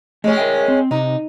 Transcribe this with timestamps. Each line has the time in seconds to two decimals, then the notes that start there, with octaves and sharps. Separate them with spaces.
0.24 G#3 A3 C#4 G4
0.37 A#4 E5 G5
0.68 C4
0.91 C3 D#4